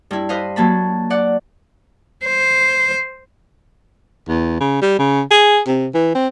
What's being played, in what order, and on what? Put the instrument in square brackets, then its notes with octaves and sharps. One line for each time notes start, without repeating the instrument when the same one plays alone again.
[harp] G2 E4
B4 C5 D#5 F5
F#3 A#3 A5 B5
D5 F#5
[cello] C5
[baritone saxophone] E2
C#3
G3
C#3
G#4
C3
E3
C4